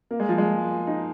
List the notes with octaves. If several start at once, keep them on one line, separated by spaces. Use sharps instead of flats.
A#3
G#3
F3
G#3
D#4